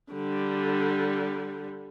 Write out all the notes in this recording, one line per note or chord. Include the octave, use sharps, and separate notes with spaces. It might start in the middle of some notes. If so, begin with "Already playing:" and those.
D3 G3